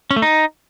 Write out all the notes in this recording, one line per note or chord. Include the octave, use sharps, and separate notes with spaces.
C#4
A3
D#4